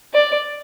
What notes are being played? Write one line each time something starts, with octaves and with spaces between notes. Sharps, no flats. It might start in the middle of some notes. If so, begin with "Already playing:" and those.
D5